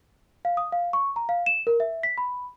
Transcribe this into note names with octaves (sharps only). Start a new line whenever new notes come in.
F5
D#6
F5
C#6
A#5
F5
E7
A#4
E5
B6
B5